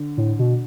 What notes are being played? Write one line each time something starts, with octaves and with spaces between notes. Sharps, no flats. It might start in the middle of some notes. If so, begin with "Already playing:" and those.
Already playing: D3
A2
B2